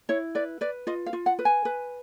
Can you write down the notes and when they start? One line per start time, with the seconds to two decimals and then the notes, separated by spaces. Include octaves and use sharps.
0.09 E4 C#5
0.35 B4 D5
0.61 B4 D5
0.87 F4 D#5
1.06 F5
1.13 F4
1.26 F#5
1.39 B4
1.45 G#5
1.65 B4